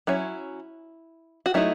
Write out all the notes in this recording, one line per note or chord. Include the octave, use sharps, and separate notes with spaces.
F#3 C#4 E4
F#4
F#3 A3 D#4 E4